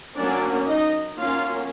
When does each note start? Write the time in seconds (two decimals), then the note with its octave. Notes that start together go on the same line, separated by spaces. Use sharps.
0.17 F#3 A#3 C#4 D4 D5
0.67 D#4 D#5
1.18 F#3 A#3 C#4 F4 F5